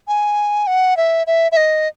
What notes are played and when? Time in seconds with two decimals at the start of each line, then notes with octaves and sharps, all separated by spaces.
0.08 G#5
0.67 F#5
0.97 E5
1.27 E5
1.52 E5
1.57 D#5